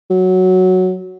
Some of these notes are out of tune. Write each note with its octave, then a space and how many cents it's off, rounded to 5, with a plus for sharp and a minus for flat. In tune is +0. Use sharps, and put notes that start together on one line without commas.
F#3 +0